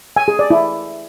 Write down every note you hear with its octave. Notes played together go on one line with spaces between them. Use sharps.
G#5
G#4
D5
E4